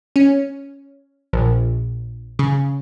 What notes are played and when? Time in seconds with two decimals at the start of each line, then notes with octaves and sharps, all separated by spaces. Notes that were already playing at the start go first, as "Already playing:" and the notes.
0.16 C#4
1.33 A#1
2.39 C#3